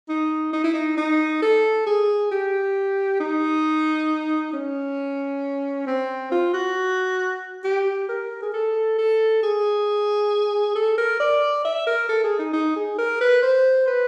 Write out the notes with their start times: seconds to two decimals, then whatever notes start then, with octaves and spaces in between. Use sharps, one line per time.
0.09 D#4
0.53 D#4
0.63 E4
0.74 D#4
0.97 D#4
1.42 A4
1.87 G#4
2.31 G4
3.20 D#4
4.53 C#4
5.87 C4
6.31 F4
6.53 F#4
7.64 G4
8.09 A#4
8.42 G#4
8.53 A4
8.98 A4
9.43 G#4
10.75 A4
10.97 A#4
11.20 D5
11.65 E5
11.87 A#4
12.09 A4
12.23 G#4
12.39 D#4
12.53 D#4
12.76 G#4
12.98 A#4
13.21 B4
13.42 C5
13.87 B4